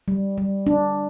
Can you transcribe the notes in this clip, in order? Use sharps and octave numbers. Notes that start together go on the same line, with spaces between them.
G3
G3
D4